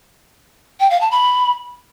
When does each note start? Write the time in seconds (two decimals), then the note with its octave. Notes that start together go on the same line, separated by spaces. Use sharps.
0.80 G5
0.90 F5
1.01 A5
1.11 B5